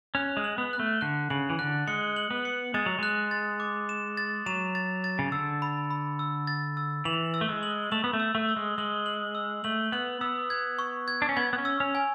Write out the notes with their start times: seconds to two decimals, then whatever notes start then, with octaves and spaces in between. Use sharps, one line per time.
0.15 C#4 F#6
0.37 G#3
0.44 F#7
0.58 B3
0.73 F#6
0.79 A3
1.01 D3 F#6
1.30 C#3 F#7
1.50 E3
1.59 D3 F#6
1.87 G#3 C#7
2.16 F#7
2.31 B3
2.45 C#7
2.74 G#3 A6
2.86 F#3
2.99 G#3 F#6
3.31 A6
3.60 D6
3.89 E7
4.17 A6
4.46 F#3 E7
4.75 A6
5.04 A6
5.19 C#3
5.32 D3 E6
5.62 B5
5.90 B5
6.19 E6
6.47 A6
6.77 E6
7.05 E3 F#7
7.34 E6
7.41 A3
7.49 G#3
7.63 F#7
7.92 A3 F#7
8.04 B3
8.13 A3
8.20 E6
8.35 A3
8.49 E6
8.57 G#3
8.78 G#3 F#7
9.06 F#7
9.35 E6
9.64 A3 F#7
9.92 B3 F#7
10.21 B3 E6
10.50 G#6
10.79 C#6
11.08 G#6
11.22 D4
11.29 C#4
11.37 B3 G#6
11.53 B3
11.58 C#4
11.65 E6
11.80 C#4
11.95 G#5